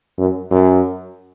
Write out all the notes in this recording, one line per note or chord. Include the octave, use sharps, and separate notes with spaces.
F#2
F#2